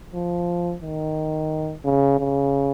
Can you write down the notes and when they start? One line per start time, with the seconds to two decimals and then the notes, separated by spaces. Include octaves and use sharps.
0.13 F3
0.82 D#3
1.85 C#3
2.19 C#3